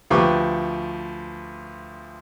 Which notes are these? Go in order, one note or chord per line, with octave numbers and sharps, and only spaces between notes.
D2 F3 G4 B4 C#6 D6